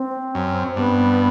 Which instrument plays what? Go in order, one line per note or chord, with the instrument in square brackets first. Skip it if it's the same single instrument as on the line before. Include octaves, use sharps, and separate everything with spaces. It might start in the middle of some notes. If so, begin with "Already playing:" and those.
Already playing: [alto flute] C4
[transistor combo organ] F#2
[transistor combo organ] G2 [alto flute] B3